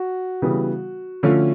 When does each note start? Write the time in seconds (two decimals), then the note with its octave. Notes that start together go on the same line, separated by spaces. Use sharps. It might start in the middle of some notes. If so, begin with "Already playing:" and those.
Already playing: F#4
0.42 C#3 E3 G3 B3
1.23 D3 F3 A3 C#4 F4